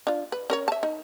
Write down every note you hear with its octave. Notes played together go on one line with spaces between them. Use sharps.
D4 F4
B4
C#4 A#4 C#5
E5 A5
D#4